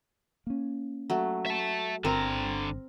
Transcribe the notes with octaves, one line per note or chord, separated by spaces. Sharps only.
A#3 C#4
F#3 A3
E5 A5
G1 D3 C4 A#4 A#5